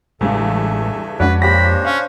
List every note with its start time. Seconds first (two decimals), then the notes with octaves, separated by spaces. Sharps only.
0.21 A1 E2 G2 C#3 G#3 A4 E5 G#5
1.20 F2 G#3 C#4 D4 F#4 B4
1.42 A#2 D4 G4 C5 C#5 B5 A#6
1.85 C#4 F5